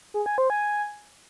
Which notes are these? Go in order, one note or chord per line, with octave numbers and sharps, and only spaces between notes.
G#4
G#5
C5
G#5